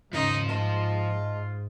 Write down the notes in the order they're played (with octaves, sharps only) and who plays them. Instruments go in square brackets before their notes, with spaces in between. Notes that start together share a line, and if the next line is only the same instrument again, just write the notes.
[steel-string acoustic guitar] D#2 C#3 [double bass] G#2 [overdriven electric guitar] F3 C6 [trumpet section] D#4
[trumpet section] F4 [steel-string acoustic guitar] D#5 A5